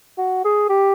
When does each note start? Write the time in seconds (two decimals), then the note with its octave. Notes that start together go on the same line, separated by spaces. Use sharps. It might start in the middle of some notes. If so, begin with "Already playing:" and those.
0.18 F#4
0.45 G#4
0.69 G4